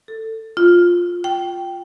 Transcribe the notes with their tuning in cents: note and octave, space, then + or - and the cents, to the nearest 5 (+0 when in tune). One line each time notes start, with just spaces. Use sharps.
A4 +15
F4 +5
G5 -5